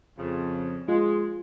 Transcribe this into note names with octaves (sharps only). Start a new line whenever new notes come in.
F2 C#3
G#3 F4